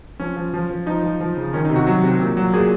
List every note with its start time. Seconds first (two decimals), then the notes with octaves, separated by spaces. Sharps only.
0.20 F3 C#4
0.37 F3
0.54 F3
0.70 F3
0.86 F3 D#4
1.03 F3
1.21 F3
1.37 C#3
1.53 D#3 C#4
1.65 D#4
1.70 C3
1.76 F#4
1.87 F#3
2.03 C3
2.20 A#2
2.37 F#3
2.53 A#2 G#4